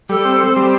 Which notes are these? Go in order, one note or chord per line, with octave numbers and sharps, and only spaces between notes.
G3 A4
C4
C4
G3